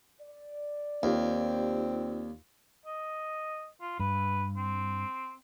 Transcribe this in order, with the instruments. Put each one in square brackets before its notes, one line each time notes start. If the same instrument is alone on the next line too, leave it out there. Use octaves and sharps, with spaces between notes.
[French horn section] D5
[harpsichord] D#2 [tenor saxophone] C4 [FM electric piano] D#4 F4 G4
[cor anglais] D#5
F4
[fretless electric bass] G2 [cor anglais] B4
[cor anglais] C4